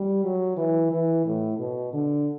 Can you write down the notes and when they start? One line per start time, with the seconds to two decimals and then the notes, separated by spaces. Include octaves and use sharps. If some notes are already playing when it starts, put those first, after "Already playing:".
Already playing: G3
0.24 F#3
0.57 E3
0.91 E3
1.26 A2
1.58 B2
1.93 D3